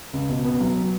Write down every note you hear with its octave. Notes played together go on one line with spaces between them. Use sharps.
C#2
B2
B3
F#3